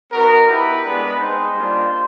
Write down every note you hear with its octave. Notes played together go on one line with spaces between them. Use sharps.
B3 D#4 F#4 A#4
B3 E4 G4 B4
G#3 B3 D4
G#3 C4 D#4 C5
G3 A#3 D4 F4